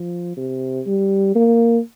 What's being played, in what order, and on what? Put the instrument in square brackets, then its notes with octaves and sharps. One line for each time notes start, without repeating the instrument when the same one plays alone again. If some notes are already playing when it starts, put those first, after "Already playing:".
Already playing: [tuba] F3
C3
G3
A#3